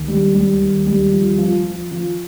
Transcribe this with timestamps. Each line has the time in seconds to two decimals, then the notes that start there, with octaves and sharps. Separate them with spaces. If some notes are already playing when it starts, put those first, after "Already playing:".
Already playing: D#2
0.08 G3
0.34 G3
0.60 D#2
0.87 G3
1.12 F3
1.38 F3
1.64 F3
1.91 F3